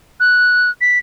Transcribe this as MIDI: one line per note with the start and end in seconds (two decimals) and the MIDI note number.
0.20 0.70 90
0.81 0.99 95